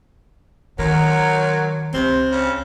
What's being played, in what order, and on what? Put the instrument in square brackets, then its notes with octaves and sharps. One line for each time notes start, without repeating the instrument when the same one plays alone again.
[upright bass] D#3 [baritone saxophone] F#3 [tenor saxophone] A#4
[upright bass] C#2 [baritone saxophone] C3 [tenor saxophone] C4
[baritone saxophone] C#3